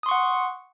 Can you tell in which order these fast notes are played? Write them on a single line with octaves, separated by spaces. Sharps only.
D#6 C6 C#6 F#5